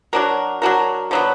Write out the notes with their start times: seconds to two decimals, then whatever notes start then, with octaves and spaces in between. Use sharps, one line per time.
0.13 F#3 D4 F#4 A#4
0.62 F#3 D4 F#4 A#4
1.11 D3 F#3 B3